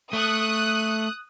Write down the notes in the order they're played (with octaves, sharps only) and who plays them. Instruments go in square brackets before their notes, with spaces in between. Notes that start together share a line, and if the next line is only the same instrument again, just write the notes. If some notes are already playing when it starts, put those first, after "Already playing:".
[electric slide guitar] A3 [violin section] D#6 F#6